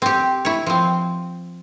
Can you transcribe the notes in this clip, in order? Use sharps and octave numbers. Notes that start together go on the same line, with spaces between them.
C4 G4
E4 C#5
F3 C4